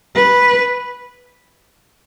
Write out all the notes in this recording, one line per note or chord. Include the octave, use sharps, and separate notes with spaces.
B4